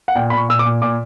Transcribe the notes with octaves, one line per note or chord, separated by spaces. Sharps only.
F#5
A#2 G5
A#2 B5
C#6
A#2 E6
D6
A#2
A#2 D6